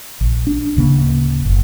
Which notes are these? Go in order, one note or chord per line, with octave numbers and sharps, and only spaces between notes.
A#1
D4
D1 C#3 A#3
F#1